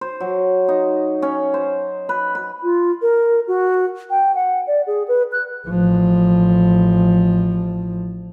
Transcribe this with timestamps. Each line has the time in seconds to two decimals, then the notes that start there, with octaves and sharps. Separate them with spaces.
0.01 C5
0.20 F#3
0.69 D#4
1.22 C#4
1.54 C5
2.09 B4
2.35 B4
2.63 F4
3.02 A#4
3.47 F#4
4.10 G5
4.35 F#5
4.67 D5
4.87 G#4
5.08 B4
5.32 F#6
5.67 A1 F3